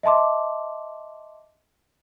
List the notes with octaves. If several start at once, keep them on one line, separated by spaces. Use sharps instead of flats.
D#5 E5 A5 C6 D6